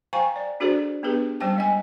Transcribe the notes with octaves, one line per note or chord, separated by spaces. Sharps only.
C5 F5 G5 G#5 A#5 C#6
D5
D4 F#4 G#4 A4 C5 D5
B3 D4 G4 G#4 B4
G3 C#4 C5 G5 A5
G#3 D#5 G#5